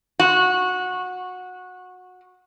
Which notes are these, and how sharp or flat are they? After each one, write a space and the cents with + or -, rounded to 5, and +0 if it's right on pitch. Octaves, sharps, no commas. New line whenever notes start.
F#4 -20